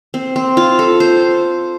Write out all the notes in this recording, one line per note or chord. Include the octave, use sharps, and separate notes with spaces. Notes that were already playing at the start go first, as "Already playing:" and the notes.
C4
C4
F4
A4
C5